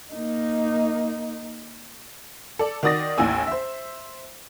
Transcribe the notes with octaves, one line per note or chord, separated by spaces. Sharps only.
A#3 D#4
A4 D5
D#3 F#4 D5 D#6 A6 A#6
A1 D#2 E4 G#5 E6
C5 E5